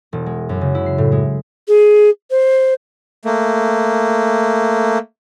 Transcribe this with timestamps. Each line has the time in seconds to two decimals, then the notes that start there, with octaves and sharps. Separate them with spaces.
0.13 E1
0.26 G#3
0.49 F#2
0.61 C#3
0.75 E4
0.86 C7
0.98 A2
1.12 G#3
1.67 G#4
2.30 C5
3.25 A3 A#3